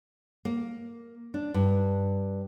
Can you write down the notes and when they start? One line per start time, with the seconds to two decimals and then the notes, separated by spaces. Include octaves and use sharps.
0.45 A#3
1.34 D4
1.54 G2